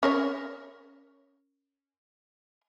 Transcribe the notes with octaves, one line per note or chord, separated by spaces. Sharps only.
C#4 A#4 C#5